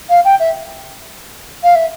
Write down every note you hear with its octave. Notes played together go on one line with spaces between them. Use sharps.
F5
G5
E5
F5
E5